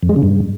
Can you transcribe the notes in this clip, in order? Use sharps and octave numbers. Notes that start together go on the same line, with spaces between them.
F2
G#3
C#3
G2